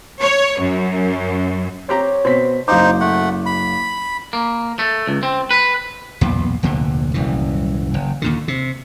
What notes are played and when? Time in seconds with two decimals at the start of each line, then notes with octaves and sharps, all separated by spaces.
0.19 C#5
0.58 F#2
1.89 C4 G4 C#5 A#5
2.25 B2 B3 C4 C5 B6
2.68 F#1 D#4 C5 F5 D6
3.01 A3 F#5
3.46 B5
4.33 A#3
4.79 A3
5.07 C#2
5.23 C4
5.51 B4
6.21 B1 E2 A#2 B3
6.63 F1 D2 A#2 D3
7.14 D#1 C2 F#2 E3
7.94 F#1
8.22 D#2 A#2 D3
8.48 C3